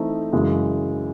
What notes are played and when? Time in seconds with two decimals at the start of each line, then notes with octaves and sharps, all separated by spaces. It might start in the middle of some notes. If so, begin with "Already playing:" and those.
Already playing: E3 A3 C4 D#4
0.32 F#2 C#3 E3 G#3